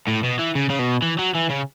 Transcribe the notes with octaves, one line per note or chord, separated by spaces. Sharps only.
A2
B2
E3
C#3
C#3
B2
E3
F#3
E3
C#3